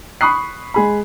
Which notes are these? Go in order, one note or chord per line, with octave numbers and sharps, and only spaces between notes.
B5 C#6 D#6 F#6 C7
G#3 G#4 B5